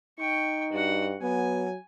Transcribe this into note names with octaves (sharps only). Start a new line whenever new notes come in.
D#4 G5 C#6
G2 F#4 F#5
F#3 B3 G#5